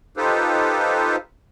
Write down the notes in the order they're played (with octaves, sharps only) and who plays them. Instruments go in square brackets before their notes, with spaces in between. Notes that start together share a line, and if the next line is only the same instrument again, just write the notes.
[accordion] D#4 F4 G4 A4 B4 C5